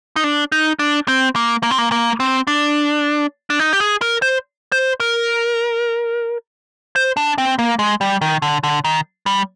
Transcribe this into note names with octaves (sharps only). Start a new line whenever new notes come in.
D#4
D4
D#4
D4
C4
A#3
A#3
C4
A#3
A#3
C4
D4
D4
D#4
G4
G#4
A#4
C5
C5
A#4
C5
D4
C4
A#3
G#3
G3
D#3
D3
D3
D#3
G3